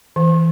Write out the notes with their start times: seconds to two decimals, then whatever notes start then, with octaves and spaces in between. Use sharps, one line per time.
0.16 E3